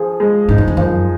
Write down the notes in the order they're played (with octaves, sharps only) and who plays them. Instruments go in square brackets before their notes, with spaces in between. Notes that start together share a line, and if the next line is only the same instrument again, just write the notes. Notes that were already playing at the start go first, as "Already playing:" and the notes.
Already playing: [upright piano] F3 G#4
G#3
[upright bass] G#2 [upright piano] D#4
[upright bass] F#2
F2
[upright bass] F#2 [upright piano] F3